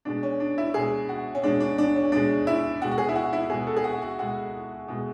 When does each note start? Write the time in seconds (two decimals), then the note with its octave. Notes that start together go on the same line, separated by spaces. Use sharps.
0.05 B2 G#3 D4
0.23 C#4
0.40 D4
0.58 E4
0.74 B2 G#3 G#4
1.09 F#4
1.35 C#4
1.43 B2 G#3 D4
1.60 D4
1.78 D4
1.95 C#4
2.12 B2 G#3 D4
2.47 E4
2.81 B2 G#3 F#4
2.91 F#4
2.98 G#4
3.09 E4
3.15 F#4
3.33 E4
3.49 B2 G#3 G#4
3.67 A4
3.77 G#4
3.84 F#4
4.02 F#4
4.19 B2 G#3 F#4
4.88 B2 G#3